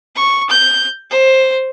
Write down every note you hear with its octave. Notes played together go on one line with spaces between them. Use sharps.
C#6
G6
C5